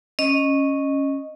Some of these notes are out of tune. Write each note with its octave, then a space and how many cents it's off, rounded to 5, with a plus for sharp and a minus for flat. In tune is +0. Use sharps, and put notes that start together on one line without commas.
C#4 -5 D#5 -10